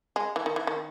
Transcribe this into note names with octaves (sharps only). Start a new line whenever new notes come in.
G#3
E3
D#3
E3
D#3